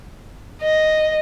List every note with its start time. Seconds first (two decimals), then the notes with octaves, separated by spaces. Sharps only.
0.62 D#5